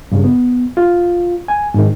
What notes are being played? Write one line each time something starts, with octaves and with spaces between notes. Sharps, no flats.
G2 C#3
B3
F4
G#5
G#2 D#3